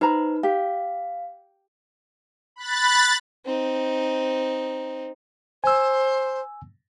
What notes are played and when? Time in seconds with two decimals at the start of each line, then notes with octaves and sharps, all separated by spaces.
0.01 D#4 B4 C5 A#5 B5
0.43 G4 F5
2.56 B5 F#6 A6
3.46 C4 D#4
5.64 C5 G#5 E6